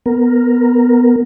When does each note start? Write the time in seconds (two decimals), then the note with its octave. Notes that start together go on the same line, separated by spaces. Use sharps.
0.06 B3 A#4